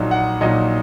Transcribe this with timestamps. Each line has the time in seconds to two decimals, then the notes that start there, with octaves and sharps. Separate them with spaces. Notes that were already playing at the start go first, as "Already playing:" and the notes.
Already playing: A#1 A#2 F#3 D#4
0.11 F#5
0.41 A#1 A#2 F#3 D#4 D#5